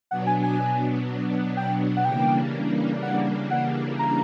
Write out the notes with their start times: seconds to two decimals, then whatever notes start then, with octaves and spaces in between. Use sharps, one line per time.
0.11 B2 F#3 B3 D4 F#5
0.27 G#5
0.43 G#5
1.57 G5
1.97 F#5
2.05 C#3 E3 G3 A#3 D4 G5
3.02 F#5
3.51 F#5
3.99 A#5